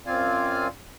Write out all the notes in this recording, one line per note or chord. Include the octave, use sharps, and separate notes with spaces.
F#2 C4 F4 D5 F5 G#5